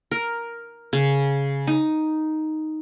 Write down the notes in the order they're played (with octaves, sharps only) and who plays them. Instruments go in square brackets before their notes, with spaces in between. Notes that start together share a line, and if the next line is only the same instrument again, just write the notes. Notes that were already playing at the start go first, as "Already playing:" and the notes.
[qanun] A#4
C#3
D#4